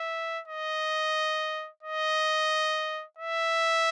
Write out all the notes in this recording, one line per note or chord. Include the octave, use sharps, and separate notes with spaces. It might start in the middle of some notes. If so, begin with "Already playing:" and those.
Already playing: E5
D#5
D#5
E5